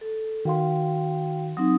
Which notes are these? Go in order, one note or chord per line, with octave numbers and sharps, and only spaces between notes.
A4
D#3 F#4 F5 G5 C6
F#3 C4 D#4 D#6